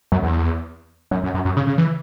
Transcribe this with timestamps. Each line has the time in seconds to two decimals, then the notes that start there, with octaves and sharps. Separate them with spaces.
0.12 F#2
0.23 E2
1.11 F#2
1.24 F#2
1.34 F#2
1.45 F#2
1.57 C#3
1.67 C#3
1.78 E3